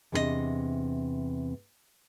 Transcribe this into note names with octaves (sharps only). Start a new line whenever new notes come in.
E2 C3 C4 D4 G#4 D#5